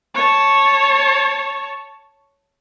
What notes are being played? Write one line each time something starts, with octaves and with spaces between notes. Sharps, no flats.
C#5 A5